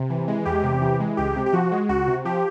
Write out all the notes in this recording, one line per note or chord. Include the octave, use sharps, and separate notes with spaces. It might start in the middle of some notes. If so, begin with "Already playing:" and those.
Already playing: C3
E3
G#3
E2 G4
C3
E3
G#3
C#2 G4
C3
G4
F3 F#4
G#3
C#2 F#4
C3
F3 G4